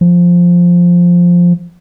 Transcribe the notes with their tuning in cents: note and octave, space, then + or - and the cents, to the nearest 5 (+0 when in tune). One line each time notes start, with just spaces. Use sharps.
F3 +5